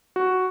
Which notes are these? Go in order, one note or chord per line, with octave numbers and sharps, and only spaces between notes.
F#4